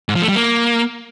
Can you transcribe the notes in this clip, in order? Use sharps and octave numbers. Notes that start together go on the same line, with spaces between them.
G#2
F3
A3
G3
A#3